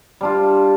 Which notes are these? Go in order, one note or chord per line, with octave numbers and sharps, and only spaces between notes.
G3 D4 F4